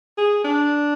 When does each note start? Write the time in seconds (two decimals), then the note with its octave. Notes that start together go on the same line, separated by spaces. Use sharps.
0.18 G#4
0.44 D4